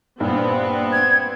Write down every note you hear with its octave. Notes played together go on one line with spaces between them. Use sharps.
G2 A#2 B3 C4
G#6